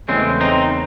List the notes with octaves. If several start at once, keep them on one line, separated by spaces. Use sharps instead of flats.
E2 C#3 E3 G#3 A3 C4 C#4
C4 D#4